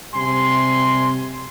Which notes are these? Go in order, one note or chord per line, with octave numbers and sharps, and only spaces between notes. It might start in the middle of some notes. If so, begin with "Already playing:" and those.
C3 G3 G#5 C6